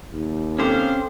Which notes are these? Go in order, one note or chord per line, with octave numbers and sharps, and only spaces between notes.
D#2
C3 C4 C#4 E4 A4 C5 F5 G5